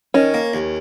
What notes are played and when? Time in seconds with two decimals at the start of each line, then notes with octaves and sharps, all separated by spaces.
0.14 D#3 C#4
0.34 A#3
0.54 D#2